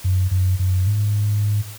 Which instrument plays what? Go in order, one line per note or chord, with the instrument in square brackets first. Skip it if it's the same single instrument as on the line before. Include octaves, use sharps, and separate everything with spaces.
[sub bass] F#2
F#2
F#2
G#2